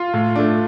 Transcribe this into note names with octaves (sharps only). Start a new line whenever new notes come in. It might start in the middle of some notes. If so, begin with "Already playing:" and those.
Already playing: F4
A2
A3 D4